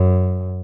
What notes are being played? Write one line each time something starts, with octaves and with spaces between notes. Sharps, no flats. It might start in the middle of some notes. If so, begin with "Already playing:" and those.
Already playing: F#2